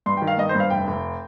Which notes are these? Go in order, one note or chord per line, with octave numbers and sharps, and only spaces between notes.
G2 C6
D#3 G5
F5
G2 D#5
C5
G2
F5
F1 G5
F1